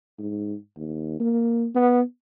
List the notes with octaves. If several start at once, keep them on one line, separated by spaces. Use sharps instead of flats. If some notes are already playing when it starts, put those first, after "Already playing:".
G#2
D#2
A#3
B3